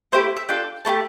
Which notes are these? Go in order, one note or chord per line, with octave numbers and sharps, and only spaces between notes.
A3 E4 G4 C5
E5
D4 F4 A4 G5
A3 E4 G4 A5